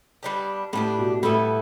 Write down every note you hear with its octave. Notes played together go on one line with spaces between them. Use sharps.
G3 B3 D4 G4
A2 G3 B3 D4 G4
B2
A2 G3 B3 E4 A4